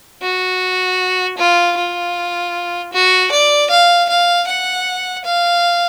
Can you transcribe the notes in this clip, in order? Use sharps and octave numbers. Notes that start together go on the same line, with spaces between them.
F#4
F4
F4
F#4
D5
F5
F5
F#5
F5